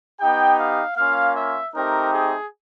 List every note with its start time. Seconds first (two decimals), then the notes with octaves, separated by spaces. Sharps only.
0.20 B3 D#4 G4 G5
0.59 F5
0.96 A#3 C#4 F4 F5
1.35 E5
1.73 A3 C4 D#4 G4 A#4
2.12 G#4